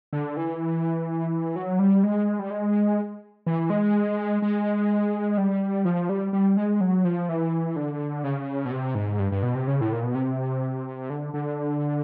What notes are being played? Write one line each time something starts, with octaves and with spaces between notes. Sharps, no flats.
D3
E3
F#3
G3
G#3
G3
G#3
E3
G#3
G#3
G3
F3
G3
G3
G#3
F#3
F3
E3
D3
C#3
B2
C3
G#2
G2
G2
B2
C3
C#3
A2
A#2
B2
C3
D3
D3